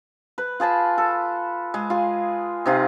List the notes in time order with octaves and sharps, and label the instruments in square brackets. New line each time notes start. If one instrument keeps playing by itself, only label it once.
[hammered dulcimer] B4
F4 G#4 A5 B5
A4
G#3
F4 G#4
C3 D#4 F4